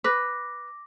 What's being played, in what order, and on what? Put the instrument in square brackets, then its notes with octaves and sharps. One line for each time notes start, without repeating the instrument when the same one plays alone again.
[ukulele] B4 [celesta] D6 A#6